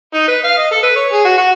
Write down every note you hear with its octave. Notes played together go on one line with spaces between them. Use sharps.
D#4
B4
F5
D#5
A4
B4
C#5
G#4
F#4
F#4